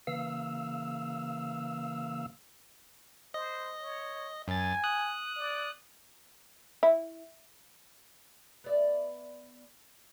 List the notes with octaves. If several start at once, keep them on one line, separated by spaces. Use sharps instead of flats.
C#3 E3 A#3 F5 E6
C5 D#5
C#5
F#2 G#5 A6
D#6 F#6
D5
E4
B3 D5 E5